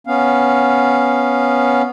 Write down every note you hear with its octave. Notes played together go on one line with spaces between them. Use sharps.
B3 C#4 F5